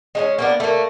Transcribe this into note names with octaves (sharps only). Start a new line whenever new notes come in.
G#3 A3 C#4
A#3 B3 D4
A3 A#3